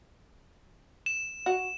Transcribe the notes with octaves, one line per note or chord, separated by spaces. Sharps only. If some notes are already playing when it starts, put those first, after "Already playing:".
E7
F#4